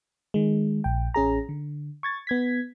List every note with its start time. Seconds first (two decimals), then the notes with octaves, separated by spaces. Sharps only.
0.34 D#3 G#3
0.84 A#1 G5
1.14 A1 C#4 G#4 A#5
1.49 D3
2.03 C#6 G#6 A6
2.27 B3 G#6 B6